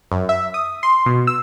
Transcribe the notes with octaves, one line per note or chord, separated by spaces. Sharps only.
F#2
E5
D#6
C6
B2
E6